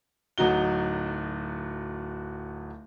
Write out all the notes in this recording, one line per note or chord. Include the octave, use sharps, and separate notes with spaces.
D1 F#3 D#4 F#4 G7